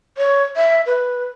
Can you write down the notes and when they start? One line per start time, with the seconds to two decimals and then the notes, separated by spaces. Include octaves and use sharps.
0.18 C#5
0.56 E5
0.86 B4